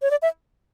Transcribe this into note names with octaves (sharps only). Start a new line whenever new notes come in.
C#5
D5
E5